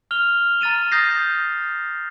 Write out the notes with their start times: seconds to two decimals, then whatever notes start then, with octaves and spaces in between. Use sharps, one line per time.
0.11 F6 F7 G7
0.61 A#5 F6 A6 D#7 E7
0.92 D#6 G6 A6 A#6 C7